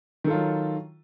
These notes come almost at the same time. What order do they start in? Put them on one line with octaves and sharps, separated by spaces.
D#3 A4 F4 F#3